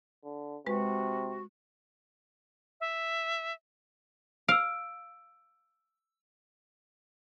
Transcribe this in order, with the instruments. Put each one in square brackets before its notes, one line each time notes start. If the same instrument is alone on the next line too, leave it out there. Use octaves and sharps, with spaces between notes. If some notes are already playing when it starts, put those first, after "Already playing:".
[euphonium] D3
[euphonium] C3 [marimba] G#3 B4 [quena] F#4
[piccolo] E5
[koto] F5 [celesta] E6 D7